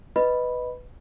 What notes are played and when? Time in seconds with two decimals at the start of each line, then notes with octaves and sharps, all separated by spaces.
0.16 B4 D#5 B5